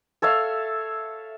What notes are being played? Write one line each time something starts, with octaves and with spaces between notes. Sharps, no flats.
A4 C#5 E5 F5